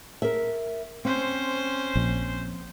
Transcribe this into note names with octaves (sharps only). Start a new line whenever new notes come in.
A#4 E5
C4 C#4 C5
A#1